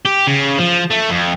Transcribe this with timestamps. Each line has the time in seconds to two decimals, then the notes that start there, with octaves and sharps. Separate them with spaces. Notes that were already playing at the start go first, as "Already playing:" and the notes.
0.05 G4
0.27 C#3
0.58 F3
0.90 A3
1.10 F2